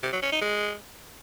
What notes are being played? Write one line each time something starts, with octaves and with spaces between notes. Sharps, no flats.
C3
F#3
C#4
D#4
G#3